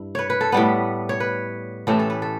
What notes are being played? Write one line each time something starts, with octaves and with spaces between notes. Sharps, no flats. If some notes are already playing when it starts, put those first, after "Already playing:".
Already playing: G2 E4
B4 C#5
B4
A4
A2 G3 B3 B4
C#5
B4
A2 E3 A3 C#4 G4
A4
B4
A4